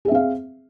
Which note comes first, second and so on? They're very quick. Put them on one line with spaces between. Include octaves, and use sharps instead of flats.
G#4 E5 C4 F5